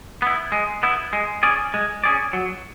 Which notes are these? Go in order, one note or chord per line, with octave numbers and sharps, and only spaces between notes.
B3 E4
G#3
B3 E4
G#3
C#4 G#4 D5
G#3
C#4 G#4 D5
F#3